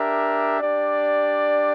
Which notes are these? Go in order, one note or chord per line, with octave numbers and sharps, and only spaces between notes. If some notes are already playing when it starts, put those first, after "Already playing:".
Already playing: D4 G4 A#4 E5
D4 G4 D5